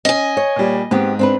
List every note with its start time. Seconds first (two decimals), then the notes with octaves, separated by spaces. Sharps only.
0.05 C#4 D#5 G#5
0.37 C#5
0.56 A#2 G3
0.91 G#2 B3 C4 G4
1.19 C4 D4 B4